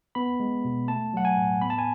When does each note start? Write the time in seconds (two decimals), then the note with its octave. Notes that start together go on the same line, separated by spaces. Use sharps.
0.15 B3 B5
0.40 G#3
0.65 B2
0.88 A3 A5
1.14 F#3 F#5
1.25 G#5
1.37 A2
1.62 B3 B5
1.70 A5
1.78 G#5